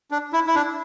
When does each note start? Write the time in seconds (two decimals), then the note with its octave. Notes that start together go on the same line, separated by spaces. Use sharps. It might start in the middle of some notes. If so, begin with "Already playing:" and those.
0.11 D4
0.33 E4
0.47 E4
0.55 D4